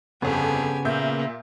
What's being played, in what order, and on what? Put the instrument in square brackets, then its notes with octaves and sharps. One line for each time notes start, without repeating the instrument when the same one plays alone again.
[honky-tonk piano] G1 F2 [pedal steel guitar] C#3 B3 [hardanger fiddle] G4 G#5
[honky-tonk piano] A#2 E5 G6 [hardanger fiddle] A#3